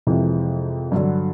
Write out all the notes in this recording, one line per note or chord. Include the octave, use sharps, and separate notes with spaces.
F2 C3 E3 G#3
G2 D3 F#3